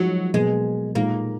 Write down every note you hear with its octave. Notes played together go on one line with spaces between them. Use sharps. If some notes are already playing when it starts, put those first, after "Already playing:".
Already playing: F3 F#3 G#3 D#4
B2 F#3 G#3 A#3
A#2 G#3 A#3 D#4